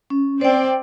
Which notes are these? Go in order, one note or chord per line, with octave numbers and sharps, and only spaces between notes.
C#4
C4 C5 D5 G5